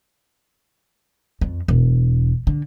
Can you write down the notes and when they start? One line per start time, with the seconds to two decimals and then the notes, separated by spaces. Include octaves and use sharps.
1.41 F2
1.68 E1
2.47 D3